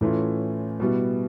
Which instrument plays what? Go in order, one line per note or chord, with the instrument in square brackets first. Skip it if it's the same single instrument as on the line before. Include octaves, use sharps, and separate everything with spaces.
[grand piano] A2 E3 A3 C#4 F4
B2 G3 B3 E4